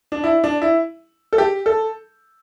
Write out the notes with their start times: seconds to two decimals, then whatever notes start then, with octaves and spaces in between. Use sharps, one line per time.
0.12 D4
0.24 E4
0.44 D4
0.62 E4
1.33 A4
1.38 G4
1.66 A4